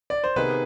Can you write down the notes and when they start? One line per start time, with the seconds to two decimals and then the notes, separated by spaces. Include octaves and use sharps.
0.10 D5
0.24 C5
0.36 C3 D#3 B3 D#4 G#4 B4